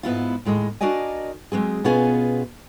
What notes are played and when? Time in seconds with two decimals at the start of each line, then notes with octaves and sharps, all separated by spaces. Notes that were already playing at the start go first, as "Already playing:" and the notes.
0.03 G#2 B3 E4 F4
0.45 D#2 A2 G#3 D#5
0.81 D4 F#4 A#4 D5 D#5 G#5
1.52 F#3 G#3 C4 G#4
1.84 B2 B3 C#4 F4 G#4 G#5